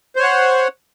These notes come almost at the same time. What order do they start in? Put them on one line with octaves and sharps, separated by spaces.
C5 C#5 F#5